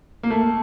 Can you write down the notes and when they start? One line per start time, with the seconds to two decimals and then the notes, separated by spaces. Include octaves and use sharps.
0.23 A#3
0.30 A3